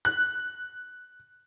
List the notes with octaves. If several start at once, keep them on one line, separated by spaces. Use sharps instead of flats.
F#6